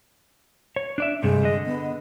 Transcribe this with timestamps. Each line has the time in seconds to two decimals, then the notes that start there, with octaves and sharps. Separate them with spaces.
0.76 C#5
0.98 D4 D5 E5
1.23 G2 C3 G#3 A3
1.43 D3 D#5
1.66 B3